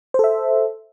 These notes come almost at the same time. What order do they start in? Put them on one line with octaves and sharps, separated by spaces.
C5 A4 E5